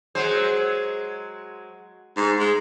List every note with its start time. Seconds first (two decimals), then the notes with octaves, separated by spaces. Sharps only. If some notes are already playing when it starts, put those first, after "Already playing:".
0.15 F#3 G#3 C5
2.16 G#2
2.39 G#3